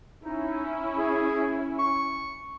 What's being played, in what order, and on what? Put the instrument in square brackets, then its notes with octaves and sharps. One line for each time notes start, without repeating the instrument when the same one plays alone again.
[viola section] C#4 E4 [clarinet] D#4
[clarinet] G#4
C#6